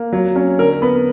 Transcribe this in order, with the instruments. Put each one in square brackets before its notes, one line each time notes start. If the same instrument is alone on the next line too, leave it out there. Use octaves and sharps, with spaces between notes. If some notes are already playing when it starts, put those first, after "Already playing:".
Already playing: [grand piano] A#3
F#3
C#4
D3 A#4
B3 B4